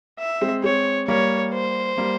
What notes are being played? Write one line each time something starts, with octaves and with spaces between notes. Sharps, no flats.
E5
G#3 C4
G#3 C4 C#5
G3 A#3 C#5
C5
G3 A#3